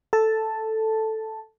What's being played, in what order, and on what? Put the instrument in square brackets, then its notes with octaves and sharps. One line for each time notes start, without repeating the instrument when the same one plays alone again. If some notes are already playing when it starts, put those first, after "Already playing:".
[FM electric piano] A4 A5